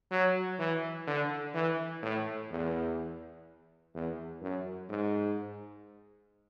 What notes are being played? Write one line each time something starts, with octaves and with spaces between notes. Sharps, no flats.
F#3
E3
D3
E3
A2
E2
E2
F#2
G#2